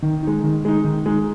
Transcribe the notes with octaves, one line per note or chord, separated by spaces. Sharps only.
D#3
G#3 D#4
D#3
G#3 D#4
D#3
G#3 D#4